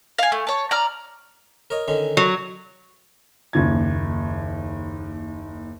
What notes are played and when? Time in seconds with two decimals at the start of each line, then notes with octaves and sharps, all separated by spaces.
0.18 F5 G#5
0.32 A3
0.47 C#5 A5
0.71 D5 A#5 F6
1.70 A#4 C#5 D#5
1.88 D3 D#3 C#4
2.17 F#3
3.53 F#1 D#2 G#6